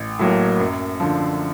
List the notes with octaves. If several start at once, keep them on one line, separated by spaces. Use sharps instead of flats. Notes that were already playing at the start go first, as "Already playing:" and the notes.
Already playing: A1
A2 F#3 A#3
F#2
D3 F3